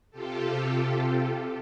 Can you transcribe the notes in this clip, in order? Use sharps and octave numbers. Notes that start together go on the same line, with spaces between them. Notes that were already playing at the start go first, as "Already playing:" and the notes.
C3 F4 G4 A4